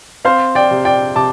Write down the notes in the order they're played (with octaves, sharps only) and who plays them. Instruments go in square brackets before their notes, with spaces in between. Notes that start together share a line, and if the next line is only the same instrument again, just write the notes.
[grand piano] C4 C5 F5
D5 G5
C3
D5 G5
C3 A5 D6